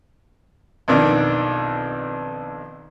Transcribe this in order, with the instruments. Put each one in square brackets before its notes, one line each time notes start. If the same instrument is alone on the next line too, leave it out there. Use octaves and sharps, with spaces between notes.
[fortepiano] B1 F2 D#3 D4